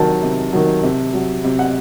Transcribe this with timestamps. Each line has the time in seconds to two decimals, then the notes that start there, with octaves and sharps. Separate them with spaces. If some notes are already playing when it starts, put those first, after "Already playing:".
Already playing: C3 D#3 F#3 A5
0.23 C3
0.53 D#3 F#3
0.83 C3
1.14 F#3
1.44 C3
1.59 F#5